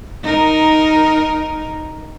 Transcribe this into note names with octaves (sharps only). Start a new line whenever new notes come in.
D#4 A#4